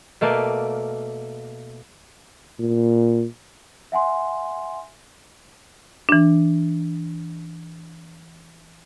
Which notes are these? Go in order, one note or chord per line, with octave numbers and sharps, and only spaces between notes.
B2 A3 A#3 D5 F5
A#2
E5 F#5 G#5 C6
E3 D4